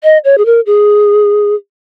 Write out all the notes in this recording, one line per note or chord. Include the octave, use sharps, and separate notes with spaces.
D#5
C#5
G#4
A#4
G#4